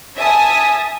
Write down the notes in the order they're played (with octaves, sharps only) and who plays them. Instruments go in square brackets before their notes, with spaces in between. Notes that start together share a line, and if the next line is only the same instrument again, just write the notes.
[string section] E5 G#5 A5 D#6